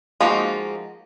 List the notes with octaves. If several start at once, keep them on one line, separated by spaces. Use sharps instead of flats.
F3 G#3 A#3 D#4 F#4